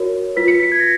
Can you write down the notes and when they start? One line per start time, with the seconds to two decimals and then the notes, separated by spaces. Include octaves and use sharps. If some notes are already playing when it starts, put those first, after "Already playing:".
Already playing: F#4 A#4 C#5
0.36 F4 B4 B6
0.48 C#7
0.60 B6
0.72 G#6
0.80 A#6